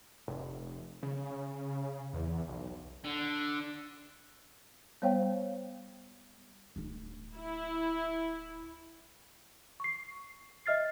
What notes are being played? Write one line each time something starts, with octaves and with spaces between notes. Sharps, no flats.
F1
C#3
E2
B1
D3
G3 B3 C5 C#5 F5 G5
D1 D#4
E4
C#6 C7
D#5 E5 F6 A6 C7